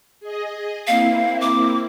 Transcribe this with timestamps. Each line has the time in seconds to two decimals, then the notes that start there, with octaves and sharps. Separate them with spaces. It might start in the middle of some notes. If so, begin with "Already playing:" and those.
0.20 G#4 D#5
0.87 A#3 C4 E4 F5
1.41 D6